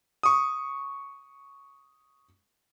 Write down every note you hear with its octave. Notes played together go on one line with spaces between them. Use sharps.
C#6 D#6